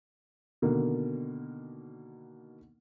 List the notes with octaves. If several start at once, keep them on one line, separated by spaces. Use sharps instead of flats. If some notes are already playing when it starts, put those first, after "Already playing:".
B2 D3 D#3 A#3 A#4